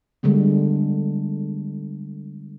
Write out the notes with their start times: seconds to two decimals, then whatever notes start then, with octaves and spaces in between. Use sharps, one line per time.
0.23 D3 G3 G#3 B3